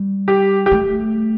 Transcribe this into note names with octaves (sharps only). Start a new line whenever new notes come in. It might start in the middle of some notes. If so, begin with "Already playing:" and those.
Already playing: G3
G4
G4
A3